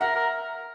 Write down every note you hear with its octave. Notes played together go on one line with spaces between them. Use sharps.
A#4 E5 F#5
A#4